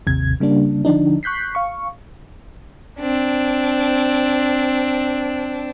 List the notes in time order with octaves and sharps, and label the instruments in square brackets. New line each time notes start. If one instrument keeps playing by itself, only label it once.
[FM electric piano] G#1 D#2 C3 G#6
C#3 G3 A#3 D4
D3 F3 D4 D#4
C#6 F#6 G6 B6 C7
F5 C#6
[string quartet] C4 D4